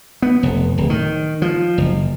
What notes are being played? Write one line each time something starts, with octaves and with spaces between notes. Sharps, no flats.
B3
F1
D1
D#3
F3
F#1